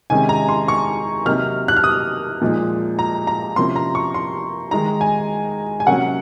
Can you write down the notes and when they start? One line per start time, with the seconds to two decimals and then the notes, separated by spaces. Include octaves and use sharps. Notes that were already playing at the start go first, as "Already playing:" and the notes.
0.10 C3 D#3 G#3 C#4 G#5
0.29 A#5
0.49 C6
0.68 C#6
1.25 C3 F#3 A#3 D#4 F6
1.68 F#6
1.76 F6
1.84 D#6
2.41 A#2 F3 G#3 D#4
2.99 A#5
3.27 A#5
3.56 C3 F3 A#3 C#4 C6
3.76 A#5
3.95 C#6
4.14 C6
4.71 D#3 G#3 D#4 A#5
5.01 G#5
5.80 G#5
5.87 C3 F#3 A#3 C#4 F#5